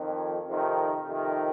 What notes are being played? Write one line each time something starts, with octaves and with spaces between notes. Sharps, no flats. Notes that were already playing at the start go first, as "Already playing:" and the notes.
Already playing: F2 D#3
F2 C3 D#3
F2 C3 D#3